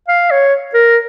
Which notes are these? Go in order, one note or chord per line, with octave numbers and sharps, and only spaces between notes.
F5
C#5
A#4